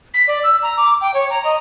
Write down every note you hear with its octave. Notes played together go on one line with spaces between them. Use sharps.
B6
D5
E6
A#5
D6
G5
C#5
A#5
D#5